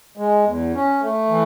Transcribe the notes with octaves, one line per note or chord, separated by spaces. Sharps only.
G#3
E2
C#4
A3
E3